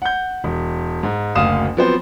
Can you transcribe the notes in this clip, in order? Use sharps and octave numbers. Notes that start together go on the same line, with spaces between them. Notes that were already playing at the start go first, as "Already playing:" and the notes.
F#5 G6
E1
G#2
F#1 D2 F5 D#6 E7
F3 F#3 B3 C4 C5